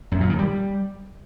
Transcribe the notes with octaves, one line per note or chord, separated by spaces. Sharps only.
F#2
A#2
D#3
G3